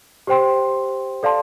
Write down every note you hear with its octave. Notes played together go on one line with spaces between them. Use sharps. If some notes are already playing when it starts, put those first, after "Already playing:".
G4 C5 G5 C6
A4 D5 F5 A5 C6